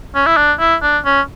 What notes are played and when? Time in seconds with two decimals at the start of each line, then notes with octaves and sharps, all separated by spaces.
0.15 C#4
0.26 E4
0.37 D4
0.59 E4
0.83 D4
1.05 C#4